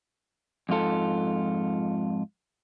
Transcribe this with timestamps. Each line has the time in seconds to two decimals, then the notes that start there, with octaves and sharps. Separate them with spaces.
0.69 F2 G#2 F4 A4